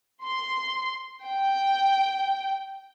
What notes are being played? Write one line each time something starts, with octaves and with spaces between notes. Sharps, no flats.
C6
G5